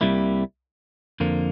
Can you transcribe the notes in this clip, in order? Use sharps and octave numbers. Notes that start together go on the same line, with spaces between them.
C2 C3 G3 A#3 E4
F2 D3 F3 A#3